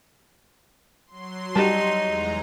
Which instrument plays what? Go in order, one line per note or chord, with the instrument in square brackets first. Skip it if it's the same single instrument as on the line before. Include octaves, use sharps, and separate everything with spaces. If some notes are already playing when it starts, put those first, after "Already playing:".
[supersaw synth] F#3 C6
[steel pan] G3 A5 [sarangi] D#4
[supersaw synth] E2 G#3 A#5